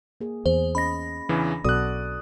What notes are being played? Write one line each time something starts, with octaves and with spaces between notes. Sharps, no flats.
A#3 G#4
E2 G#4 C5
C#4 D#5 B5 A#6
E2 C#3 E3 D4
B1 B2 F#4 A4 D5 D#6 F#6